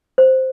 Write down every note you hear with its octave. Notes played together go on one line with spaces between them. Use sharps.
C5